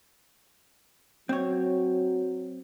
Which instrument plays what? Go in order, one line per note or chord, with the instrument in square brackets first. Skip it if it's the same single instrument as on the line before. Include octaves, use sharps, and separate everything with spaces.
[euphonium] F#3 [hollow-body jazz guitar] C4 C#5